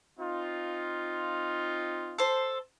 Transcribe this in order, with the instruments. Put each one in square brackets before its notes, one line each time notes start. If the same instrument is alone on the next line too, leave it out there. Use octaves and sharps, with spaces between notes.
[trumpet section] C4 D#4 F4
[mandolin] A4 C5